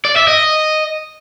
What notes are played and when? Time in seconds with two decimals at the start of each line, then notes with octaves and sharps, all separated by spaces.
0.05 D5
0.16 E5
0.28 D#5